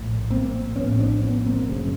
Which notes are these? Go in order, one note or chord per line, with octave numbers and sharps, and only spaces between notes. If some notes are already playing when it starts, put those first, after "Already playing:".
Already playing: A#1 A2
A#3 C4
A#1 A2 B3 C#4
C4 D4
B3 C#4
A#3 C4
G#1 F#2 C#3